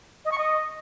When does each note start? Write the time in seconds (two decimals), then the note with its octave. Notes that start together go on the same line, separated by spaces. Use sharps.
0.25 D#5
0.31 C#6
0.38 D#5